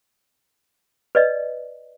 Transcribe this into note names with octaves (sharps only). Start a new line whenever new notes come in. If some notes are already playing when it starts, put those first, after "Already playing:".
B4 D5 D#5